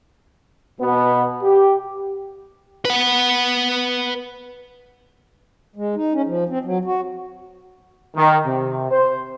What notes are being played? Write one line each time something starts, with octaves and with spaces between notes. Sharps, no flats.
B2 B3
G4
B4 F#5
G#3
D#4
C#4
F3
C4
F#3
F#4
D#3
C3
C5